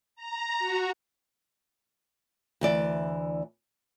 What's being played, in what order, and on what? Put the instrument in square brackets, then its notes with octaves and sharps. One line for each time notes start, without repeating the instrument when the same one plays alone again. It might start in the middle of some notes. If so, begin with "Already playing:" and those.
[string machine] A#5
F#4
[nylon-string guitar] D2 E3 D5